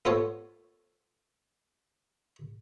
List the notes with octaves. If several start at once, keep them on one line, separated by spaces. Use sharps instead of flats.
B3 F4 A4 C5 C#5